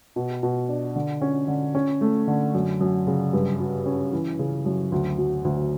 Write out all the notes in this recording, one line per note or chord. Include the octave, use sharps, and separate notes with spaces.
B2
B2
D4
D3
C#4
D3
C#4
A3
D3
F#2
F#2
C#3
G2
F#3
C#4
E3
C#3
F#2
D2
F#3
D2